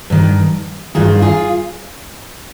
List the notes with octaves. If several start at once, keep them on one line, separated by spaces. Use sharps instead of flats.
G2 D#3
G2 D#3 F4 G#4
F4 G#4